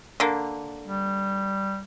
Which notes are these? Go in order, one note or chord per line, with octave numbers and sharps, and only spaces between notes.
D3 A#3
G3